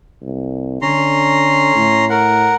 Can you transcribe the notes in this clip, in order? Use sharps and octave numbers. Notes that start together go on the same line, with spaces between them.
C2
D3 C#4 A#5 C6
A2
A#4 F#5